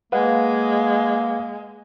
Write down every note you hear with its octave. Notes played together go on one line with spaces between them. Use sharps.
G#3 A#3 B4 F5 F#5